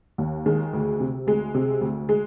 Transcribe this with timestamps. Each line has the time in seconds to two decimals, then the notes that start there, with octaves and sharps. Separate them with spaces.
0.18 D#2
0.46 D#3 G#3
0.74 D2
1.00 C3
1.27 D2 G#3
1.55 C3
1.81 D2
2.09 G#3